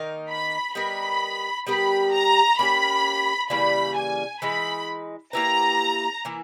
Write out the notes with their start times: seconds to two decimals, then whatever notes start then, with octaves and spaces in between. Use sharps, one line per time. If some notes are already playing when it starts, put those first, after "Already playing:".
Already playing: D#3 A#3 D#4 A#4
0.29 B5
0.75 G3 B3 D#4 A#4 B5
1.67 G3 B3 G4 A#4 B5
2.13 A#5
2.58 A#3 C#4 G4 B5
3.50 C#3 E3 G3 A#3 B5
3.96 G#5
4.41 E3 G#3 D#4 B5
5.33 A#3 E4 G4 B4 A#5
6.25 E3 A#3 E4